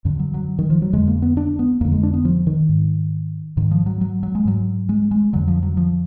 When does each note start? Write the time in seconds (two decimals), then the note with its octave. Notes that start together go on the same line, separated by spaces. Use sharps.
0.05 F#2 D3
0.19 F#3
0.34 F#3
0.59 D#3
0.70 F3
0.82 F#3
0.93 F2 D3 G#3
1.08 A#3
1.22 B3
1.37 D4
1.59 B3
1.81 F2 D3 A#3
1.92 G#3
2.03 D4
2.14 B3
2.25 F3
2.47 D#3
2.69 G#2
3.57 G#2 D#3
3.71 F3
3.86 F#3
4.01 F#3
4.23 F#3
4.35 G#3
4.45 G#2 F#3
4.89 G#3
5.11 G#3
5.33 F2 D3 F#3
5.48 F3
5.63 F#3
5.77 F3